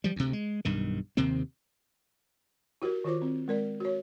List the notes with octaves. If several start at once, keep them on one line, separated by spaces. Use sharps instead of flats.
F3 G3
D2 C3
G#3
B1 G2 D#3
D#2 C3 D#3 C4
E4 F#4 G4 A#4
D#3 F4 C5 D6
C4
G#3 A#4 D5
F#4 C#5